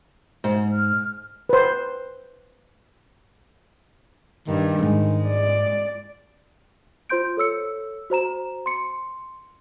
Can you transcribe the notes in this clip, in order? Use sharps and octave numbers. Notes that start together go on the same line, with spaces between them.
G#2
F6
B4 C5
G2 D#3
E2 G#2 G#3
D5
F4 C5 C6 G6 D7
A4 C#5 E6 C#7
F#4 C5 A#5 E7
C6 C#7